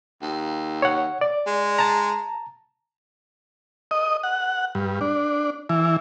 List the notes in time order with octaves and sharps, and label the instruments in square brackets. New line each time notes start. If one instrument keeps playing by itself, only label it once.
[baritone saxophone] D#2
[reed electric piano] C#5 F#5
D5
[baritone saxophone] G#3
[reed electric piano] A5 A#5
[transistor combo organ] D#5
F#5
G2
D4
E3